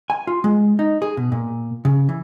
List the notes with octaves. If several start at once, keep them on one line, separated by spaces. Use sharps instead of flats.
G#5
F4
G#3
D#4
G#4
B2
A#2
C#3
E3